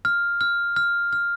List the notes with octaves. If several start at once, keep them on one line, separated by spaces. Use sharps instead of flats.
F6
F6
F6
F6